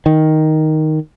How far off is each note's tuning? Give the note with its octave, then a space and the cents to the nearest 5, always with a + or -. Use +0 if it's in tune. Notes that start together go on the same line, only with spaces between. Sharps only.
D#3 +5